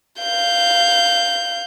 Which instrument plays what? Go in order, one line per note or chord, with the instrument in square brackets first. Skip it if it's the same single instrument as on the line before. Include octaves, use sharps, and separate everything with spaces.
[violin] F5 G6